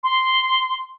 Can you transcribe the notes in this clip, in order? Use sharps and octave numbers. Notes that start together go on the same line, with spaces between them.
C6